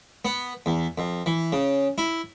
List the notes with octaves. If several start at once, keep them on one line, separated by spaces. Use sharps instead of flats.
B3
E2
F2
E3
C#3
E4